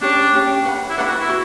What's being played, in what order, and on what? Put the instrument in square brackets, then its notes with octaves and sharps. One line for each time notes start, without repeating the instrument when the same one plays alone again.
[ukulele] C#4 G4 C#5 [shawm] D4
[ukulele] C#4 G4 C#5
B4 F#5 B5
[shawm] E4
[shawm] D4 [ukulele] B4 F#5 B5
[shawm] F#4
E4
[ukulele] F#4